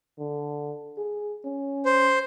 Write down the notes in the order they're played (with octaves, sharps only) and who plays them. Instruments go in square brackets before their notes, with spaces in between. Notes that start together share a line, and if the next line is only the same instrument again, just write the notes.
[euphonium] D3
G#4
C#4
[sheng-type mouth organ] C5